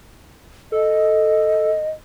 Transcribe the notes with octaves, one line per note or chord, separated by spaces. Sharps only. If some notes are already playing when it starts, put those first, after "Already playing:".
A4 D#5